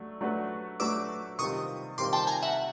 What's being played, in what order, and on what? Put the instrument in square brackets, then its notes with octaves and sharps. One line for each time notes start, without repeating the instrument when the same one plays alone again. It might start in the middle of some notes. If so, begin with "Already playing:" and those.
Already playing: [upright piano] F#3 A3 D4
F#3 A3 D4 F#4 B4
[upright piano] F#3 A3 D4 F#4 B4 [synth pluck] D6 E6
[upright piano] C3 D#3 G3 C4 F4 [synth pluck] C#6 D#6
[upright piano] C3 D#3 G3 C4 F4 [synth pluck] C6 D6
[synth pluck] G5 A5
G#5 A#5
E5 F#5